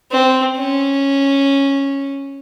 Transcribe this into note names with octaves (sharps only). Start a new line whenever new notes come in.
C4
C#4